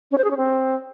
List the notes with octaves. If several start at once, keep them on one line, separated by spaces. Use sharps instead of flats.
C#4
C5
G#4
C#4
C4